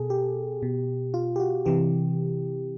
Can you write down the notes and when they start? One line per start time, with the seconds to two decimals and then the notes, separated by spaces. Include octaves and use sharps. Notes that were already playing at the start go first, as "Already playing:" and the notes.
Already playing: B2 G#4 A4
0.10 G4
0.63 B2
1.14 F4
1.36 G4
1.40 F#4
1.66 C3 E3 G4